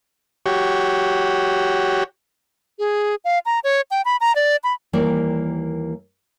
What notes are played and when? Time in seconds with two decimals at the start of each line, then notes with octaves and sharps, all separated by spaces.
0.46 F#4 G4 C#5
2.79 G#4
3.25 F5
3.46 A#5
3.64 C#5
3.91 G5
4.05 B5
4.21 A#5
4.36 D5
4.64 B5
4.93 D#2 E3 G3 A#3 A#4 D5